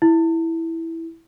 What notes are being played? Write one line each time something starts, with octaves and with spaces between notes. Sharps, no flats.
E4